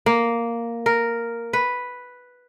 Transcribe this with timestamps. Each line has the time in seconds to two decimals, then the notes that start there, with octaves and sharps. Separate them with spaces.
0.06 A#3
0.86 A#4
1.53 B4